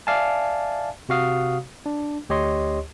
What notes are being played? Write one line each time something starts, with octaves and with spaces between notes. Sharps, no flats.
D5 E5 F5 G#5 A5
C3 F#4 F5 D#6
D4
D2 G4 C#5 D#5 C6